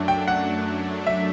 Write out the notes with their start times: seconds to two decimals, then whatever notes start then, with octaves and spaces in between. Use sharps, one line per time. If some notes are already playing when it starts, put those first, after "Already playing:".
Already playing: F#2 F#3 A3 D4
0.08 G5
0.28 F#5
1.06 E5